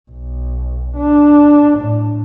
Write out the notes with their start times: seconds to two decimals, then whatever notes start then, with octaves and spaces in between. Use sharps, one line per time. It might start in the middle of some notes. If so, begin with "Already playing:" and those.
0.11 B1
0.96 D4
1.79 A2